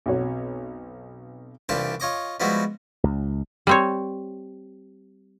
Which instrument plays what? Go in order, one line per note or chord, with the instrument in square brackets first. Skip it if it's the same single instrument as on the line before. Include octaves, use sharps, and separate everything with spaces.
[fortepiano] B1 F2 F#4 C#5
[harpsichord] C2 E3 D4 F4 G4 A5
F4 C#5 D#5 D6
F3 G3 G#3 B3 E4 F#4
[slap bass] C#2
[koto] G3 C4 C#5